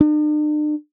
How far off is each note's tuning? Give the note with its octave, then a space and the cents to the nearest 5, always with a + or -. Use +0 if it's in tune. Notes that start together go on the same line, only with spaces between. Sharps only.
D4 +45